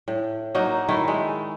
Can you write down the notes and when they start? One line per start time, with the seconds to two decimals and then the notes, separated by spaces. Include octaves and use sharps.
0.08 A2
0.55 F#3 A#3 D#4
0.89 D#3 A3 E4
1.08 G#3